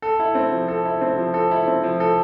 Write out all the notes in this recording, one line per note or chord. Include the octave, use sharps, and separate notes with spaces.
A4
E4
C4
F3
A4
E4
C4
F3
A4
E4
C4
F3
A4